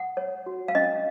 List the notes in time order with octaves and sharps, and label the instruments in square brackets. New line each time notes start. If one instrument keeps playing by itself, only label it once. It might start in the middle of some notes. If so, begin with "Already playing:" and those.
Already playing: [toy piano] F#5
C#5
F#4
F5
C#4 D#5